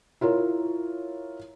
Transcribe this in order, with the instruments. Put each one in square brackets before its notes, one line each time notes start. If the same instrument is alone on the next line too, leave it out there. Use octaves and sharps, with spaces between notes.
[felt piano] E4 F4 A#4 C#5